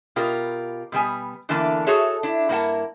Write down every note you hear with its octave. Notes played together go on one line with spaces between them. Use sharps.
B2 F4 G4 A#4
B2 G3 B3 G#5
E2 D3 E3 A#3 D4 A5
F#4 G#4 A4 C#5 E5
D4 E4
G2 A#3 E4 A#4 F#5 A5